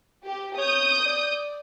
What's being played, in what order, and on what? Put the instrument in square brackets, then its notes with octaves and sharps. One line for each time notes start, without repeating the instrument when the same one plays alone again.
[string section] G4
[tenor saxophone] C#5 [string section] D#6 G6
[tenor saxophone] D5